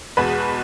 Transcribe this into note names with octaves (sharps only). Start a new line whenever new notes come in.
E2 B2 G#3 B3 B4